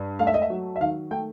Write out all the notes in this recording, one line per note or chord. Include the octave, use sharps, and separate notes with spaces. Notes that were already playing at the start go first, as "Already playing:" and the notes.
Already playing: G2
A3 F5
E5
D#5
E5
F#3
E5
D#3 F5
A3 G5